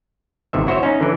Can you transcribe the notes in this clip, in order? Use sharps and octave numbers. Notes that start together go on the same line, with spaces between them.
G1 C3 D#3 E5
E4 F#4 C5 C#5 E5
C#4 D#4
D3 E3